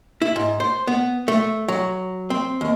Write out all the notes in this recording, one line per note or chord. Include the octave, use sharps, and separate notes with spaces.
E4
G#2
C5
B3
A3
F#3
C4
D#2